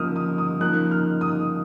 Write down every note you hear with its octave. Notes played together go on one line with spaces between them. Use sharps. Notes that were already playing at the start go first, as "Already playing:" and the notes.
Already playing: C#3 F3 A#3 D#6 F6
D#6
D#6
C#3 F3 A#3 D#4 F#6
F6
D#6